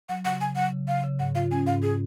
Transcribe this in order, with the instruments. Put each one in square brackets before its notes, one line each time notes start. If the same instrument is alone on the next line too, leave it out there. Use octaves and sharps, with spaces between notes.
[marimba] F#3 [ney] F#5
[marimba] C#3 [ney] F#5
[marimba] C#3 [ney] G#5
[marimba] F#3 [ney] F#5
[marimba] C#3
[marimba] C#3 [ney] F5
[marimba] C#3
[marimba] G#2 [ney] F#5
[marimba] F4 [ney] F5
[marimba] C#4 [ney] G#5
[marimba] G#2 [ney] F5
[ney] G#4